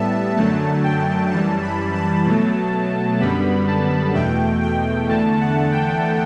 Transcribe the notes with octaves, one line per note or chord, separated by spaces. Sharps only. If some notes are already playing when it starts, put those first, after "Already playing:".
Already playing: A2 G3 B3 E5 A5
F#2 D3 F#3 A3 A5
G5
F#2 E3 G3 A5
B5
A5
B2 F#3 A3
F#2 D3 G3 B3 B5
A5
E2 B2 A3 G5
G5
E2 D3 A3 A5
F#5
G5